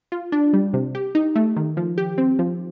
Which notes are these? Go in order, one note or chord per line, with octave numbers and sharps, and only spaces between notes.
F4
D4
G3
C3
G4
D#4
A3
D#3
F3
G4
C4
F3